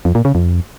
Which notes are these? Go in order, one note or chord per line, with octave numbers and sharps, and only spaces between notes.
F2
A#2
C#3
F2